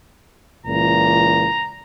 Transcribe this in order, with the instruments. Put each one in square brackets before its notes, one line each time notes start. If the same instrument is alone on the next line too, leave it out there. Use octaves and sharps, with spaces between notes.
[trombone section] C#2 A#2 E3 [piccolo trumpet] A#5